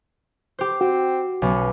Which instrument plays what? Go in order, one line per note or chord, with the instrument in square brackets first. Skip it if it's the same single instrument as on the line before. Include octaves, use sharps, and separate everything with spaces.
[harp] G4 C5
[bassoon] C4 [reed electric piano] F#4
[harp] B1 [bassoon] C#4